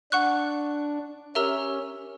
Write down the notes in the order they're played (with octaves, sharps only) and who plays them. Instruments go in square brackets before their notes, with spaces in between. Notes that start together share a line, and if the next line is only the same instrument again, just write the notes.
[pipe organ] D4 [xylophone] F#5 C#6 F#6
[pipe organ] C#4 [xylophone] G4 A#4 E5 A#5 E6